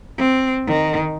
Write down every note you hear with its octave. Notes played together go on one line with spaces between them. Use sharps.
C4
D#3